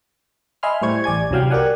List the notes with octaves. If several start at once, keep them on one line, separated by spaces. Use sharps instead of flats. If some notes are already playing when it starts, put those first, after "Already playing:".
D#5 E5 G#5 B5 C6 F6
A2 G3 C5 C#6 G#6
A1 D5 G#5 G#6
C2 C3 F#3 F5 G5
G4 A#4 D5 F#5 G#5